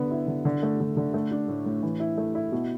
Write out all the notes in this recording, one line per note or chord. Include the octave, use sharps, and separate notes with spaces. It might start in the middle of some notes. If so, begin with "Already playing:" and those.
Already playing: D3 B3
E4
D3
D3
A3
D3
D3
A3
D4
A2
A2
E3
E4
A3
E4
B2